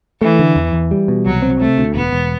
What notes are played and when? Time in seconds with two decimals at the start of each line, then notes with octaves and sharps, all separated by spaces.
0.21 E3 A3
0.39 D3
0.56 E2
0.73 E2
0.91 G3
1.08 B2
1.25 C2 F#3
1.42 C4
1.60 C3 A3
1.78 D2
1.95 E1 B3
2.13 E1